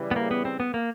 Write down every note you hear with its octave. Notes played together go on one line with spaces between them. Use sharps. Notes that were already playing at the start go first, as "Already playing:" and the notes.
Already playing: C#3 E3 G3
B3
A#3
B3
C4
B3
A#3